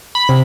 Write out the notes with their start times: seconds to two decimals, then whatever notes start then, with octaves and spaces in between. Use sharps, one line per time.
0.15 B5
0.29 C3